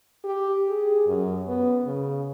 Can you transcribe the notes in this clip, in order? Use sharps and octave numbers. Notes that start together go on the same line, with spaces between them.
G4
G#4
F#2
B3
C#3